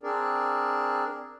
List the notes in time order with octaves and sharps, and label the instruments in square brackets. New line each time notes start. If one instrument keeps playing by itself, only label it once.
[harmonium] C4 D4 G#4 A#4 D5